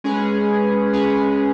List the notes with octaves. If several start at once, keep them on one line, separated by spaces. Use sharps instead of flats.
G#3 C#4 G#4 B4
G#3 C#4 G#4 B4